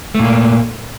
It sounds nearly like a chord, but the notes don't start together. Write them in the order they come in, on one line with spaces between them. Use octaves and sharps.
A3 A#2 A#3